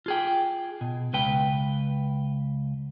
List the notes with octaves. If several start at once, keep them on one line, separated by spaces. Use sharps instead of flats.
F4 G#4 G5
B2
C#2 B4 G5